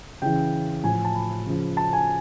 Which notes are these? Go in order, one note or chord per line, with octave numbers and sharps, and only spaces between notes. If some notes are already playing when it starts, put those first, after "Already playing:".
C#3 E3 G5
A2 F3 G#5
G#5
A5
B5
C#3 F3
A5
G#5